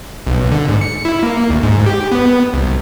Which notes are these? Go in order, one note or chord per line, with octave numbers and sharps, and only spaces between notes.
B1
D3
G#2
C#7
E4
A#3
D2
G#2
G4
B3
C2